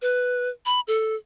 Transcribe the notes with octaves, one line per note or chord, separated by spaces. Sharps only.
B4
B5
A4